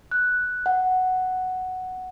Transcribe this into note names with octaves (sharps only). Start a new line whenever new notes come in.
F#6
F#5